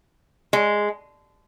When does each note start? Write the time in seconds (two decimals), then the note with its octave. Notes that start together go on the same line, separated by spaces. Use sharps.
0.53 G#3